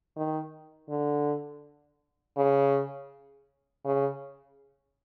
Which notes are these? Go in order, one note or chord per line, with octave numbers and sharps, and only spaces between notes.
D#3
D3
C#3
C#3